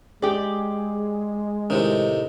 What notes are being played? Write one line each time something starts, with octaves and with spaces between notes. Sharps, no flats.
G#3 G4 G#4 D5
A2 C3 D#3 D#4